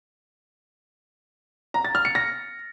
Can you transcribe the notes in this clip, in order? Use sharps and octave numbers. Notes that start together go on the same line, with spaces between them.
A#5
A6
F6
C#7
A#6